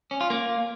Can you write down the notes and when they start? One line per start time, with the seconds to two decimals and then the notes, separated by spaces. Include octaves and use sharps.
0.11 C#4
0.21 F4
0.30 A#3